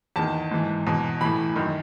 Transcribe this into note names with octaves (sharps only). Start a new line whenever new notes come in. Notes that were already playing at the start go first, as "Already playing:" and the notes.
E2 D#3 A5
G#2 E3
E2 B2
A2 E3 B5
F#2 D#3